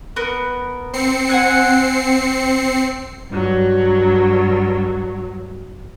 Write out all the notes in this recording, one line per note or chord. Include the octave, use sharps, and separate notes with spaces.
B3 A#4
C4 C7 C#7
F#5 G#5 F#6
G2 F#3